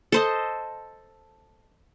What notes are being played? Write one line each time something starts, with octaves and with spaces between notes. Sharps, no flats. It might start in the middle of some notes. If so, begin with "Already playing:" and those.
A4 C5 D#5